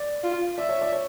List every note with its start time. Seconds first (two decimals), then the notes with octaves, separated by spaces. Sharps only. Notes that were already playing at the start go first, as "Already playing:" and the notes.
Already playing: D5
0.23 F4
0.58 D5 E5
0.69 C#5
0.81 D5
0.92 C#5